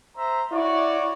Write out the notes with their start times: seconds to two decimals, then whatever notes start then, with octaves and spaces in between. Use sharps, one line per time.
0.17 C5 E5 A#5
0.52 E4 F#4 C#5 D5